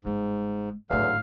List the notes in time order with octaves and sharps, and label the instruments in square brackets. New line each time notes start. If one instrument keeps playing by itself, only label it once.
[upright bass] G1 G#3 [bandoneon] G#2
[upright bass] G#1 A2 [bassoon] E2 [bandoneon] D3 F#3 [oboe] F5